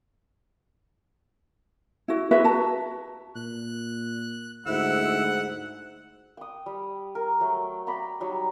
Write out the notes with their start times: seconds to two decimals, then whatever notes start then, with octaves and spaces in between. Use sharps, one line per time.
2.08 E4 F#4
2.31 F#4 G#4 B4 E5
2.44 F#4 A5 A#5
3.36 A#2 F#6
4.66 D2 G#2 E4 F#5 E6
6.37 G5 D#6
6.66 G3
7.15 A#4
7.41 F#3 A3
7.87 D5 G5 A#5 B5
8.20 F#3 G3 D#4